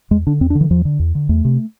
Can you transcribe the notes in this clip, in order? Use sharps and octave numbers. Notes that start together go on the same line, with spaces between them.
E2 G#3
D3 D4
E2 C4
D4
D3
E3
E2 F3
D3
E2
D3
E2 A3
C3